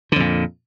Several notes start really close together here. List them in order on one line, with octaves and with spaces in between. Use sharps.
D3 F2 A#2